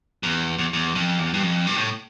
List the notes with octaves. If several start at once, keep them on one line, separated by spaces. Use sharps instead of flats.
E2
E2
E2
F2
E2
G2
F2
G2
A2